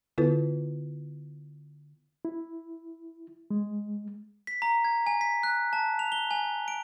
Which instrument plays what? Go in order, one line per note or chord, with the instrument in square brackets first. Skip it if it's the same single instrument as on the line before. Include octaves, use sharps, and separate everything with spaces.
[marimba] D3 B3 E4 F4 A4 B4
[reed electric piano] E4
G#3
[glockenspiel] B6
A#5
G#6
G#5
B6
F#6
A5
F7
G7
G#5
D7